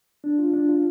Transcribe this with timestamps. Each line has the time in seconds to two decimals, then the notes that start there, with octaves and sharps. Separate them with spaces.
0.24 D4
0.39 F4
0.53 D4
0.69 F4